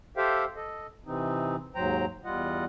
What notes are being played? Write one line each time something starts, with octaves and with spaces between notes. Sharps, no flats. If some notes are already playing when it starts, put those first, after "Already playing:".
G4 A4 C5 E5 F5 G5
A4 D#5
C3 E3 C4 D#4
D#2 G#2 F#3 C5 G5 A#5
E2 G3 F4 D#5 F#5